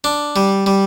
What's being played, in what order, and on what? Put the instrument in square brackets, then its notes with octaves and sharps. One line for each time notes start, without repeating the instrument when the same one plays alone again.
[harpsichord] D4
G3
G3